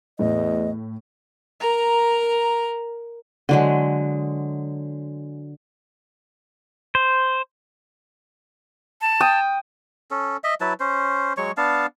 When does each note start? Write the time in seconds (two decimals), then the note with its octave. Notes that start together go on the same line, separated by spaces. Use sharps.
0.19 E2 A2 D#5
1.60 A#4 A#5
3.49 D3 F#3 G#3
6.95 C5
9.01 A5
9.21 G5 D#6
10.11 C#4 A4
10.44 D#5 E5
10.61 F#3 E4 B4 A5
10.80 C#4 C5
11.37 F#3 G#3 C#5 C#6
11.57 B3 D4 F5 A5